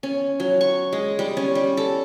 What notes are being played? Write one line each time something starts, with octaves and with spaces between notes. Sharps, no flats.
C#4
F#3
C#6
G#3
G3
C#4
G3
A4